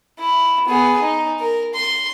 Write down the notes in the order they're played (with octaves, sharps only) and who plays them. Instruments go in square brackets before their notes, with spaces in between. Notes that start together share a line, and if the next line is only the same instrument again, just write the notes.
[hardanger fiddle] E4
B3 G#4
D#4
A#4
C6